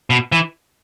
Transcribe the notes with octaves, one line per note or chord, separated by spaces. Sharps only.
B2
E3